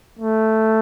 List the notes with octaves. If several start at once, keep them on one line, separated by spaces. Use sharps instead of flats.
A3